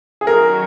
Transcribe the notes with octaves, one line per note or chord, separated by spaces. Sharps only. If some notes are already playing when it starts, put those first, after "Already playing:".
G#4
D#3 F#3 C#4 F#4 A#4